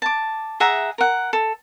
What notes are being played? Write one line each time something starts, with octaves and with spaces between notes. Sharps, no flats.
A5 D6
G#4 E5 F#5 A#5
A#4 F#5
A4